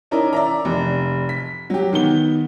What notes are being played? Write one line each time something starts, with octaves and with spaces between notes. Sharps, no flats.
C#4 D#4 E4 A#4 D5
D5 E5 A#5
F1
B6
F#3 G4
D#3 B3 G7